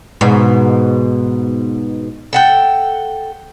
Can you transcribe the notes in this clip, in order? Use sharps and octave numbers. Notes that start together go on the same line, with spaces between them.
G#2 B2
A4 F#5 G5